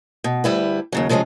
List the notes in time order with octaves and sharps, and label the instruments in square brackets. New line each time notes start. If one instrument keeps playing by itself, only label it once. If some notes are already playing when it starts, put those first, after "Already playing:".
[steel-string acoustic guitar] B2
D2 G3 E4 B4
D#2 C#3 F#3
C3 F3 G#3 C4 C#4